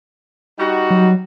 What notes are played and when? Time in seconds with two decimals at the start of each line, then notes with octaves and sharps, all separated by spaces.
0.59 G3 D#4 F#4
0.91 F#3